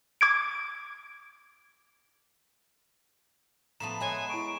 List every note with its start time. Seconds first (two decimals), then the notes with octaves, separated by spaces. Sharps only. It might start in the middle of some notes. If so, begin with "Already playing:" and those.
0.21 D6 G#6 D7
3.80 A2 F3 B3 A5 A#5 E7
4.00 G#3 C#5 E5 F#5 G#5
4.29 E4 A#5 C#6 D7